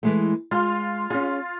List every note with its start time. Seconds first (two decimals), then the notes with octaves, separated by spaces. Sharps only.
0.03 E3 G#3 A3
0.51 G#3 F4 F5 C6
1.10 C#4 F4 G#4